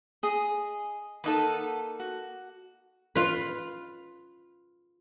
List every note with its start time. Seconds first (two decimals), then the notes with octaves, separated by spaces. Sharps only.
0.23 G#4 D#5
1.24 A#3 D#4 A4 B4 F#5 A5
2.00 F#4
3.15 F4 B4